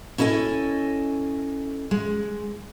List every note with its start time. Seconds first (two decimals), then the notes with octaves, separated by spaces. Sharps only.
0.18 C#4 E4 A4 D#5 G#5
1.91 G#3